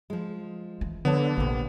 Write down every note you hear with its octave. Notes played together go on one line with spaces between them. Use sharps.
F3 G#3
E3
D3 F3 B3 C#5 A5
A#1 C3 A#3